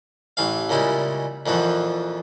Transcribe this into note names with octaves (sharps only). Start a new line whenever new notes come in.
A1 E3 F5
A#2 C#3 G3 G#3 E4
F2 A#2 E3 F3 F#4